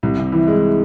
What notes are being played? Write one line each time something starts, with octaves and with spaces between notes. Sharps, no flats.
C2
C3
E3
G#3